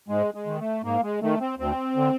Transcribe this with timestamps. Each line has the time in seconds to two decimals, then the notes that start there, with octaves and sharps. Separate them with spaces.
0.09 G#2 G#3
0.34 G#3
0.46 D#3
0.59 A3
0.84 G#2 A#3
1.03 G#3
1.22 D#3 A3
1.40 C4
1.59 D2 C4
1.96 D3